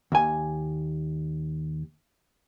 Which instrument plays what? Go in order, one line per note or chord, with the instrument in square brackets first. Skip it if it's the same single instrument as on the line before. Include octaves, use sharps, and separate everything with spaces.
[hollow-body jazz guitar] D#2 G#5